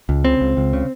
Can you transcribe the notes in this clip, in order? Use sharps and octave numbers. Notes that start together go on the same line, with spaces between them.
C#2
C#3 C4
C#2
C#2
C#3